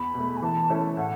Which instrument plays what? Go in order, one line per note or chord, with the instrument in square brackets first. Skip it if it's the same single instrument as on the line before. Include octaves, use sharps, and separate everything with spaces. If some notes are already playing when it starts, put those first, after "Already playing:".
Already playing: [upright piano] E2 [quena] B5
[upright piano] B2 A3
[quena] G#5
[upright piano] E3 [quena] A5
[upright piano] A3 C#4 E4 A4
[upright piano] A2 [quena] F#5